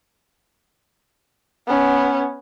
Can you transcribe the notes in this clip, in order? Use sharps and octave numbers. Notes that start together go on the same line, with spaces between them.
B3 C#4